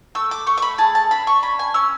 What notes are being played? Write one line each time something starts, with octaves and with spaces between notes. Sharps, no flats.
A3 E6
D6
A3 C#6
C#6
B5
G#4 A5
A5
D4 B5
C#6
C#4 B5
G#5
C#4 E6